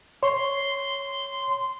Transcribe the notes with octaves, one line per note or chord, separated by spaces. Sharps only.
C#5 C6